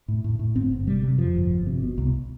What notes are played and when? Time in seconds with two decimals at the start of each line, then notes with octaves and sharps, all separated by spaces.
0.08 A2
0.24 A2
0.39 A2
0.55 G1 C4
0.71 G1
0.87 C3 G3
1.03 C3
1.18 F2 F3
1.35 G1
1.51 G1
1.66 C3
1.83 B2
1.98 C2